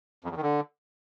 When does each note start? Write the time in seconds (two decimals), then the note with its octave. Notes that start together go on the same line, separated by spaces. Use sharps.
0.25 F2
0.30 E2
0.36 D#3
0.42 D3